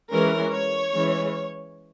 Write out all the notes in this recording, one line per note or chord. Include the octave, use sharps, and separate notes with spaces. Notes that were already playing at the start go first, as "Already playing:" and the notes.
E3 G#3 C#4 A#4
C#5
E3 G#3 C#4